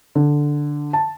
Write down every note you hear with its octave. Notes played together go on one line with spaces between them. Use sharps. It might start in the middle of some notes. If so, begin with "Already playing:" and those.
D3
A5